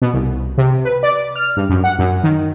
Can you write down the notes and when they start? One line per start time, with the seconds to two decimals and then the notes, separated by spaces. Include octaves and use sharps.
0.02 B2
0.13 C2
0.58 C3
0.85 B4
1.03 D5
1.36 F6
1.57 G2
1.69 F#2
1.84 F#5
1.99 F#2
2.23 D#3